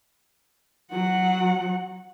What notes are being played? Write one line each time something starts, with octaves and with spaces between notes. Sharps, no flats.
F#3 F#5